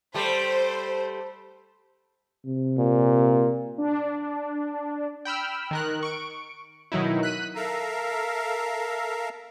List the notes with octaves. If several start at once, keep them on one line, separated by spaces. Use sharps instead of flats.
G3 A3 C5
C3
A#2
D4
G5 B5 E6 F6
D#3 A#4 F#6
C#6 D7
B2 D#3 F#3 D#4 E4
F#6 B6 D#7
A4 A#4 E5 F5 A#5